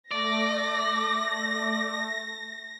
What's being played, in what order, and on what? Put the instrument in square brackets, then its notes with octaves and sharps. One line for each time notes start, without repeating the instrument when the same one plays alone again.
[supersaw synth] A3 [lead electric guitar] D5 [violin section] A#6